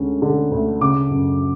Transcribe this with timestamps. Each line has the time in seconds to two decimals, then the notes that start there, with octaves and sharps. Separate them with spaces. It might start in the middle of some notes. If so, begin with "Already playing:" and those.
Already playing: D2 D3 G#3 C#4
0.22 D3
0.52 D2
0.81 C#3 D6
1.11 F#2